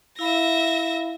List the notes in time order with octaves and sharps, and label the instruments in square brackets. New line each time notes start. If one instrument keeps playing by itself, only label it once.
[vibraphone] E4 F5 B5 [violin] E5 A#6